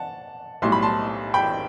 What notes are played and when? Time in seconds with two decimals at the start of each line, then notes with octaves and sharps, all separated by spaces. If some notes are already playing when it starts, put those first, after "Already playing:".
Already playing: F#5 A5
0.62 B1 A2 G3 C6
0.72 B5
0.82 A5 C6
1.34 G5 B5